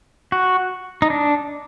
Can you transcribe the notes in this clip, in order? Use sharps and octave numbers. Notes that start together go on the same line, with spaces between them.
F#4
D#4
D4